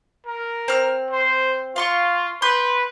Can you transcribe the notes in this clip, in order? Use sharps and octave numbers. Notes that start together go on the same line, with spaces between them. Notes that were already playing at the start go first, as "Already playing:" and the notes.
A#4
C4 F6
C5
F4 F5 C6 C#6
B4 C6 G6